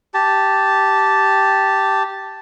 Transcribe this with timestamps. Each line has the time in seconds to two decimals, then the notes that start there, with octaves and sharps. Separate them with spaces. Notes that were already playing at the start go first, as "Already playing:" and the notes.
0.14 G4 A5